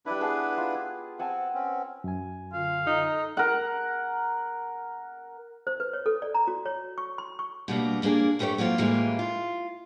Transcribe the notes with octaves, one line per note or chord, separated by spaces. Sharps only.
G3 D4 E4 B4 B5
B3 G#4 A5
F4
C4 F#5 G#5 A5
C4 C#4
F#2 G#5
D3 F4 F5
D#4 A4 A#5
A#4 F#5
C5
B4
C#5
A4
D5
A#5
F#4
C#5
C#6
C6
C#6
B2 G3 A#3 D4
F3 A#3 D4 G#4 A#4
G2 A3 G4 A#4 C#5
F#3 A#3 C4 F4
A2 E3 G3 G#3 A#3 F4
F4